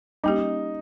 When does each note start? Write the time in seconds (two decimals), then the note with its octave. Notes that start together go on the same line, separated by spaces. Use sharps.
0.24 G3 A#3 C#4 D#4 G4